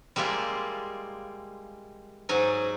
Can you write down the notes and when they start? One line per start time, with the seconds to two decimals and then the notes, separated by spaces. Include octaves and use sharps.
0.16 G3 G#3 A#3 E4 F4
2.29 G#2 F#3 D#4 G#5